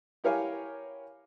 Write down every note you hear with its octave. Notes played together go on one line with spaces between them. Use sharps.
E4 G4 A#4 C#5 F5 G#5